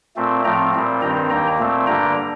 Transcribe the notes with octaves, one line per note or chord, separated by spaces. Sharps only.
A#2 A3 C4
A2 F3 A3 C4 G5 A#5
A#2 G3 C4
G2 D#3 G3 C4 G5 A#5
D#2 D#3 A#3 G5 A#5
A#2 A3 C4
G2 D3 G3 A#3 G5 A#5